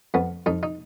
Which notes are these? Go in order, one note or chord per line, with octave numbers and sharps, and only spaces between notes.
F2 B3
F2 D#4
D#4